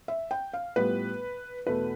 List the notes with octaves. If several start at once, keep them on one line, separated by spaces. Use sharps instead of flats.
E5
G5
F5
A2 G3 B3 F4 B4
E2 B2 A3 B4